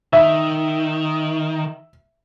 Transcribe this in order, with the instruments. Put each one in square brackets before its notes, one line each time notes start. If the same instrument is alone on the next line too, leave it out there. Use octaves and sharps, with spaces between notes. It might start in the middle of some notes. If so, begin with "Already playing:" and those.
[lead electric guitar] D#3 [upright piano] E5